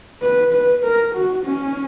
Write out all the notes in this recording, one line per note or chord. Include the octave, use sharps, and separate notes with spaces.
B4
B4
A#4
F#4
C#4